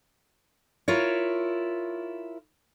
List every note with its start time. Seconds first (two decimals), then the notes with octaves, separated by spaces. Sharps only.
0.88 E4 F4 A#4 C#5